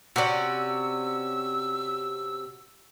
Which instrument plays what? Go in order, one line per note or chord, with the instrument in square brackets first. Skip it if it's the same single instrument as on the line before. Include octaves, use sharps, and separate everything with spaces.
[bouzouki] C3 C#4 [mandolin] F#4 D5 [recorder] E6